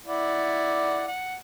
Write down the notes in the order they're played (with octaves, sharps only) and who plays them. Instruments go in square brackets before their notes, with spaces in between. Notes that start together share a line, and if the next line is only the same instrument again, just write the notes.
[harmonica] E4 D5 F#5
F#5